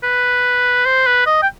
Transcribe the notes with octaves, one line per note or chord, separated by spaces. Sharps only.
B4
C5
B4
D#5
G5